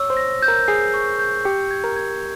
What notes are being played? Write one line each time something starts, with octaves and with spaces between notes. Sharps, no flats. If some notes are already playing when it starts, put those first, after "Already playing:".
Already playing: C#5 E6
C5
A#6
G6
A#4
G#4 C7
C#6
G6
G4 C#7
G#6
A#4
G#6